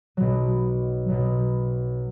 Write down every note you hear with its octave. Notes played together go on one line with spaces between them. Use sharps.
B1 B2 F#3
B1 B2 F#3